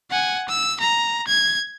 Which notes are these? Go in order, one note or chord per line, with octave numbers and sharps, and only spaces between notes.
F#5 G#5
E6
A#5
G#6